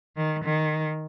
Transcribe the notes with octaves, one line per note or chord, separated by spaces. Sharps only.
D#3
D#3